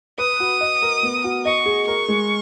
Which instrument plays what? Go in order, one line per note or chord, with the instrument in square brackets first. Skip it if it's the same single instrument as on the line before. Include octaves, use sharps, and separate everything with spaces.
[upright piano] B4 [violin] D#6
[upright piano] F#4
D#5
A#4
B3
F#4
[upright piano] D#5 [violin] C#6
[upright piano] G#4
[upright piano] A#4 [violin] C#6
[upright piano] G#3